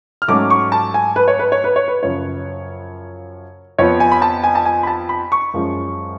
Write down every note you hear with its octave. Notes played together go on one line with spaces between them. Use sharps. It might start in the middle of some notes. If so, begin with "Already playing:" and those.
F6
G#2 F#3 A3 C#4 D6
C#6
A5
G#5
B4
C#5
B4
C#5
B4
C#5
B4
F#2 C#3 F3 C#5
F2 F3 B3 C#5
G#5
B5
A5
G#5
A5
G#5
B5
A5
B5
C#6
F#2 F3 G#3 C#4